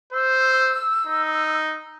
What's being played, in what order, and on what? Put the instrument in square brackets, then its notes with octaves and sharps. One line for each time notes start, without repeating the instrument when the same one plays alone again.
[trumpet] C5 [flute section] E6
[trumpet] D#4